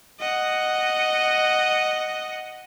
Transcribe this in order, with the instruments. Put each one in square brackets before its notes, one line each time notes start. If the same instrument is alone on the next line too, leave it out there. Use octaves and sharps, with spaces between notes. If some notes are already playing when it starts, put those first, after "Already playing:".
[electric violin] D#5 F#5